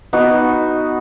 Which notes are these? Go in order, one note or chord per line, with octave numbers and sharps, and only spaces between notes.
B3 D#4 F#4